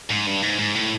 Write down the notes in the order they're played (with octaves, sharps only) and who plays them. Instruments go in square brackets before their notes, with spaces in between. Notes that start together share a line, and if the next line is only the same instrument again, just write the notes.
[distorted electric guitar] G#2
G2
G#2
G#2
A2